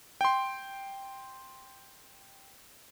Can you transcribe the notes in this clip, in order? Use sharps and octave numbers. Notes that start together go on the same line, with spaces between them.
G5 C6